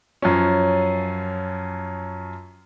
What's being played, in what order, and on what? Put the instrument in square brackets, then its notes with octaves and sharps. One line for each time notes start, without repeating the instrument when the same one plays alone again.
[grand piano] F#2 F3 C#4